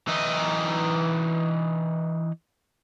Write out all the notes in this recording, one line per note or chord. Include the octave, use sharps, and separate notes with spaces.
E3 D#4